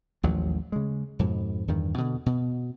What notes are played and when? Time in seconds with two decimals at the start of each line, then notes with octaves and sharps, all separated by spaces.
0.23 A1 D#2 F3 F#3
0.72 C#3 G#3
1.19 F2 G#2 B2
1.68 E2 G2 D#3
1.98 B2 D3
2.26 B2